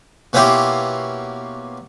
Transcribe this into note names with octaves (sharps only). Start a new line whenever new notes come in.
B2 A#3 C#4 E4 F4 G4